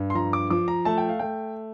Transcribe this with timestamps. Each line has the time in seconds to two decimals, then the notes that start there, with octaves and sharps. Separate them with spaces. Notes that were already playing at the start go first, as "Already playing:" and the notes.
Already playing: G2
0.10 C6
0.15 F3 A#5
0.33 D6
0.50 F3 D6
0.68 A#5
0.85 A3 A5
0.98 G5
1.09 F5
1.19 A3 G5